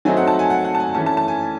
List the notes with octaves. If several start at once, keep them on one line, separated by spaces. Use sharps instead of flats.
F#3 A3 C4 D#4 G#5
F#5
A5
G#5
F#5
F#5
A5
G#5
E3 A3 C#4 A5
A5
A5
G#5